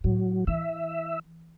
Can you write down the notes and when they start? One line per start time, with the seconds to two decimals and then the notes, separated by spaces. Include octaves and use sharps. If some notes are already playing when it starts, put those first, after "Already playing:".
0.04 A2 F#3
0.47 E3 E5